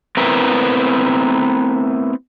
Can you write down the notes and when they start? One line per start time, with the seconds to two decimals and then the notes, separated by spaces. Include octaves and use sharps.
0.17 A3 B3 C4 E4 A#4 B4